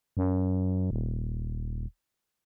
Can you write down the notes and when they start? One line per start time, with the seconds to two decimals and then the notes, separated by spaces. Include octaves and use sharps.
0.17 F#2
0.91 D#1